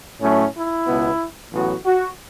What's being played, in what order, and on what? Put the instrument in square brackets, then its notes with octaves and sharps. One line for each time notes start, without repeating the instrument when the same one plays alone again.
[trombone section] A2 F#3 A3 C#4
E4
C#2 B2 B3
A1 A2 F#3 B3 F#4
F#4